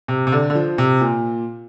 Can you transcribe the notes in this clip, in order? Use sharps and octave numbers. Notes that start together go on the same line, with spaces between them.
C3
C3
D3
D3
F3
C3
A#2